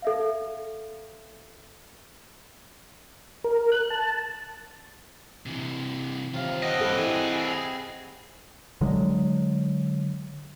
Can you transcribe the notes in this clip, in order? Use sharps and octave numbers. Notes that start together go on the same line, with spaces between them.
A4 E5 F5
A#4
F#6
A5
C3 E3
C3 D#3 F4 F5 A#5
C4 D#5 F#5 A5
G2 E4 A4
E3 G#4
D3 F#3 G#3